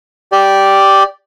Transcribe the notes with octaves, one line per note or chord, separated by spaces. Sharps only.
G4 D5